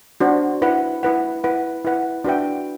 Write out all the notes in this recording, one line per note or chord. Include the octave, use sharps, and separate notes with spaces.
D4 F#4 C5
E4 B4 F#5
E4 B4 F#5
E4 B4 F#5
E4 B4 F#5
D4 F#4 B4 E5 G5